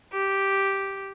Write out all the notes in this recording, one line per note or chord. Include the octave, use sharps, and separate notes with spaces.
G4